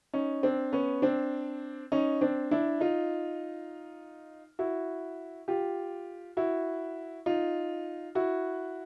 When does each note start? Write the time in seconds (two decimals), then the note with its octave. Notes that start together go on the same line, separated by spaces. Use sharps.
0.13 C#4 D#4
0.43 C4 D4
0.73 B3 C#4
1.02 C4 D4
1.92 C#4 D#4
2.21 C4 D4
2.51 D4 E4
2.81 D#4 F4
4.59 E4 F#4
5.48 F4 G4
6.37 E4 F#4
7.26 D#4 F4
8.15 E4 F#4